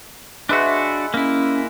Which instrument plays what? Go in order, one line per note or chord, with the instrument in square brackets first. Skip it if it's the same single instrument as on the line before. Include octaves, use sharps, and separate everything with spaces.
[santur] G#3 B4 E5 [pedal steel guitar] D4 F#4
[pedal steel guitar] A#3 E4 [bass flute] C#4